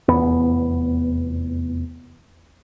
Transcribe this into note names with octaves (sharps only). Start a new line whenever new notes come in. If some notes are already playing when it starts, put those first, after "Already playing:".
F1 E2 B3